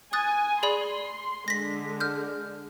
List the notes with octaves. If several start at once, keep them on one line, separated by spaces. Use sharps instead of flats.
G#5 D#6 F#6 A6
G#4 D5 B5 C6
D3 G#3 A#6 B6
F6 G6